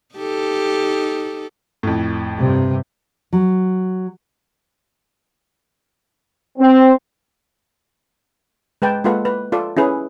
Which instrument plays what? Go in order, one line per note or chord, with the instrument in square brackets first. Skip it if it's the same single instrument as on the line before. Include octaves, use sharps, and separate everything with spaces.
[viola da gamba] D#4 G4 A4
[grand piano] F2 A2
[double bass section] G2 C3
[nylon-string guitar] F#3
[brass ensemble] C4
[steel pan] G#3 B4 G5 A5
G#3 A#3 F4 A4 B4 F#5
B4
F4 A4 D5
C#4 E4 G#4 B4